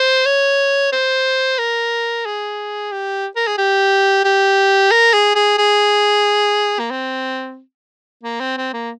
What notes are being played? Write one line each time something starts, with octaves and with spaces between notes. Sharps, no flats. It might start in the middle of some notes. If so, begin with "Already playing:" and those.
Already playing: C5
C#5
C5
A#4
G#4
G4
A#4
G#4
G4
G4
A#4
G#4
G#4
G#4
A#3
C4
A#3
C4
C4
A#3